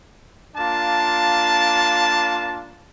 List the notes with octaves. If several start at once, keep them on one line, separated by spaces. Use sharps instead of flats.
A#3 D4 F4 A5